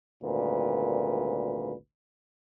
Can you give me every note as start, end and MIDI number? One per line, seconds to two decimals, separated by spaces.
0.22 1.74 32
0.22 1.74 38
0.22 1.74 46
0.22 1.74 55
0.22 1.74 71